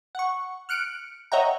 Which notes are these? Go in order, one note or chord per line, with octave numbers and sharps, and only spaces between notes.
F#5 C#6
F6 F#6 C#7 D7
C#5 D#5 E5 F#5 G5 A#5